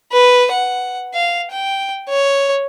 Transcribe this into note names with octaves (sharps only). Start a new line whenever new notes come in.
B4
F#5
F5
G5
C#5